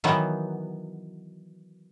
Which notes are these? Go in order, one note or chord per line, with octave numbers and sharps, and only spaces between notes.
D#3 E3 F#3 B3